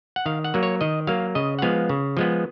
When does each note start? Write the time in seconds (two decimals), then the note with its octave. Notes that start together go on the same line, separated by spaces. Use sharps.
0.16 F#5
0.26 D#3 F5
0.44 F#5
0.54 F#3 A#3
0.63 C#5
0.81 D#3 D#5
1.07 F#3 A#3 F5
1.35 C#3 D#5
1.59 F#5
1.62 F3 G#3 B3 F5
1.89 C#3
2.17 F3 G#3 B3